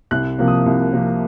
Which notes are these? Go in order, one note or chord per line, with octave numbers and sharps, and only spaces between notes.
C2 F#6
C3 F3 A#3
D#6
C2
C3 F3 A#3